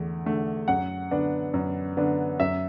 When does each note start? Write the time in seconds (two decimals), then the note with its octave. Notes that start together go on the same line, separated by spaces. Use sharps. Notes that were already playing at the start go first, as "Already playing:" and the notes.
Already playing: E2 D3 A3
0.26 D3 A3
0.68 F#2 F#5
1.11 D3 B3 D4
1.54 F#2
1.97 D3 B3 D4
2.40 F#2 E5